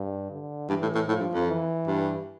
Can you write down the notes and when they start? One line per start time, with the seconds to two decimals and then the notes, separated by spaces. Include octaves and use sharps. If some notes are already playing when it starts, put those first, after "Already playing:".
Already playing: G2
0.30 D3
0.69 G2 E3
0.82 A2
0.95 A2
1.08 A2 F3
1.21 G2
1.34 F2
1.47 E3
1.87 G2